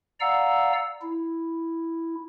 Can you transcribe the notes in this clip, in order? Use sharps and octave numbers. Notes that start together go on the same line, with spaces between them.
D5 F5 F#5 A#5 E6
E4